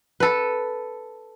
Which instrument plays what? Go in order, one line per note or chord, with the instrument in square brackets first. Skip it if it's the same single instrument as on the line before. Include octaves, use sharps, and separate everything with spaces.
[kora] A4 B4